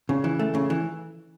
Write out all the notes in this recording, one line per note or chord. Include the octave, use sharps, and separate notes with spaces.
C#3
E3
A3
C#3
E3